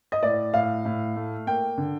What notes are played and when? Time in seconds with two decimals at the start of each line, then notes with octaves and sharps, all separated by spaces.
0.12 D#5
0.23 A2 D5
0.53 A2 F5
0.85 A2
1.16 A3
1.47 A#3 G5
1.78 D3